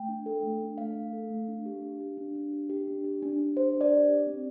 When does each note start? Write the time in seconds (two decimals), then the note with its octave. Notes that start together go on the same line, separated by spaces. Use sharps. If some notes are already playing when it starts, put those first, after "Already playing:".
Already playing: A3 G5
0.08 D4
0.26 A4
0.43 A3
0.60 D4
0.78 A3 F5
0.95 A3
1.13 A4
1.30 A3
1.48 D4
1.66 G4
1.82 D4
2.01 G4
2.18 D4
2.35 D4
2.53 G4
2.70 G4
2.88 D4
3.04 G4
3.22 D4
3.39 D4
3.57 G4 C5
3.74 D4
3.81 D5
3.92 G4
4.09 G4
4.27 C4